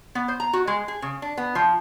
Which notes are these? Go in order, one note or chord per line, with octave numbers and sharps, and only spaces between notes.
B3
C5
A#5
F#4
G#3
G#4
C#3
D4
B3
F3